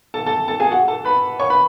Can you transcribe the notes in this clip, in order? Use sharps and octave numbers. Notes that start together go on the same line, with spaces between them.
A4 A5
A4 A5
A4 A5
G#4 G#5
F#4 F#5
A4 A5
B4 B5
C#5 C#6
B4 B5